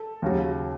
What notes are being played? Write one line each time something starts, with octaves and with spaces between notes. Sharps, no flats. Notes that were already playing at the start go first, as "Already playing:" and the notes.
Already playing: A4
D#2 C#3 F#3